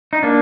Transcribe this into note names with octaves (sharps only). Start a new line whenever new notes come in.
D#4
A#3 D4